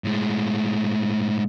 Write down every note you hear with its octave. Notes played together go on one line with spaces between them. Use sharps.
A2 G#3